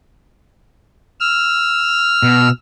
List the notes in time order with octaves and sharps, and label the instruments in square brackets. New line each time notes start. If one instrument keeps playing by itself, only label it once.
[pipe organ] E6 F6
[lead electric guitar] B2